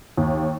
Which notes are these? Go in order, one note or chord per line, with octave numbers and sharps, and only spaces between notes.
D#2